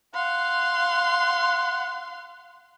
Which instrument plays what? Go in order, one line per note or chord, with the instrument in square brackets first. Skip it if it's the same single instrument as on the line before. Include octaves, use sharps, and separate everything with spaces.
[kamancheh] F5 C6 [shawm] F#5